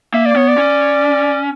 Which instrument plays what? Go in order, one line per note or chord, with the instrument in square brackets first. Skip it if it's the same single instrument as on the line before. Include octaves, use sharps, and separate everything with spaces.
[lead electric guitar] A#3 [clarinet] E5
[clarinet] D5
[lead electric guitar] B3 [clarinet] C#5
[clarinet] D5
[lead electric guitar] C#4